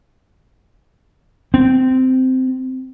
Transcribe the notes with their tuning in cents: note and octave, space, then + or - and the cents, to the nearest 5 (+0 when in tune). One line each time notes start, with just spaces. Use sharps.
C4 -15